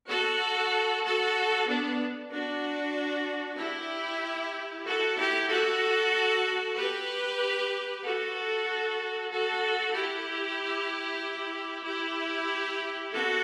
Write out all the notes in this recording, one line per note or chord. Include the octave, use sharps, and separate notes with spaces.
F#4 A4
F#4 A4
B3 D4
D4 F#4
E4 G4
F#4 A4
E4 G4
F#4 A4
G4 B4
F#4 A4
F#4 A4
E4 G4
E4 G4
F#4 A4